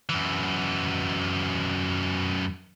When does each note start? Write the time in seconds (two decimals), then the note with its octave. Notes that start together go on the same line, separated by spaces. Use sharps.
0.09 F#2 E3